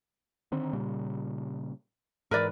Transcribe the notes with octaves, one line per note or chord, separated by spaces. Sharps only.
D3 D#3 C4
A#2 C#3 G3
G#2 E3 A#4 B4 D5